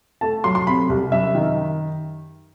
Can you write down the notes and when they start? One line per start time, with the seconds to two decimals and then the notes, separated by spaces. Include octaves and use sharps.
0.21 A3 A5
0.44 F#3 C6
0.55 C6
0.67 C3 B5
0.89 C2
1.12 F#2 E5
1.35 D#3